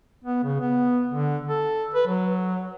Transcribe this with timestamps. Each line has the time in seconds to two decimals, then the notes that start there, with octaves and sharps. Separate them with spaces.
0.24 B3
0.44 C#3
0.60 B3
1.12 D3
1.48 A4
1.94 B4
2.07 F#3